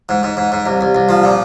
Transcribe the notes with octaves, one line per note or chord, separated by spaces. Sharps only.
G#2
G#2
G#2
G#2
C2
C2
C2
F3
A#2